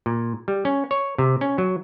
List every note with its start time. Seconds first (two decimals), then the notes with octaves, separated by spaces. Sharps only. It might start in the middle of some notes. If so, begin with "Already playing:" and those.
0.06 A#2
0.48 G3
0.65 C#4
0.91 C#5
1.18 C3
1.41 C#4
1.58 F#3